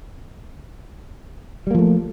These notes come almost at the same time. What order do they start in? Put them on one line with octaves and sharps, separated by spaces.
G3 A#3 F3 A3